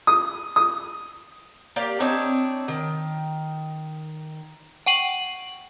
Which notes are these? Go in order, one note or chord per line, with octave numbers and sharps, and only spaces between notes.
D#6
D#6
A#3 G4 D5 F5
C4 D4 D#4 C#5
D#3
F#5 G5 C#6 C7 D#7 F#7